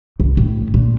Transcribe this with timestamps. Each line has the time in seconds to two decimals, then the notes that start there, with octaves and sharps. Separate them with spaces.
0.20 C2
0.37 A2
0.74 A#2